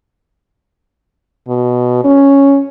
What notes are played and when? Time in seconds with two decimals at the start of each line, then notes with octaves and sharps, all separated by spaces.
1.48 B2
2.04 C#4